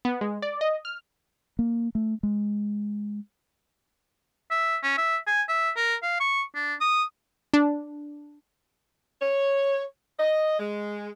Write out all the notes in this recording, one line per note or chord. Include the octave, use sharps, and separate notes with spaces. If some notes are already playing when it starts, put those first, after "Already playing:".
B3
G#3
D5
D#5
F6
A#3
A3
G#3
E5
C#4
E5
G#5
E5
A#4
F5
C#6
D4
D#6
D4
C#5
D#5
G#3